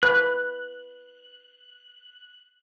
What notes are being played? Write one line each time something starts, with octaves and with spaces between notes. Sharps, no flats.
B4 F#6